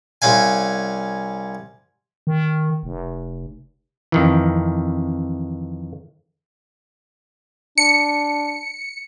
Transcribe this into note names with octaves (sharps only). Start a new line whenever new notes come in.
C2 C#4 F5 G#5
D#3
F1
F2 D#3 E3
D4 C#7